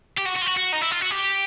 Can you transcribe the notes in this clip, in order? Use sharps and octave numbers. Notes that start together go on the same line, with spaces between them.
G4
F#4
F#4
F4
F#4
F#4
D#4
E4
F4
F#4
G4